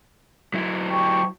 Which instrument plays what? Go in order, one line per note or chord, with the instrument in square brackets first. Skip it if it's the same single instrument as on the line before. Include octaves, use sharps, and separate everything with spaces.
[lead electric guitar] F#3 E4
[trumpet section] G4 C#6